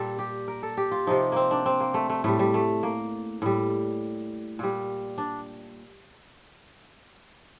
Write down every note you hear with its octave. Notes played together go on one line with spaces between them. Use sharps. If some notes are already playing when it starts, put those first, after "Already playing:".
Already playing: A#2 G3 A4
G4
A#4
A4
G4
F4
C3 F3 D#4
A#3 C4
D4
C4
A#3
A3
A3
A2 G3 A3
G3
A3
A#3
A2 G3
A#2 G3
D4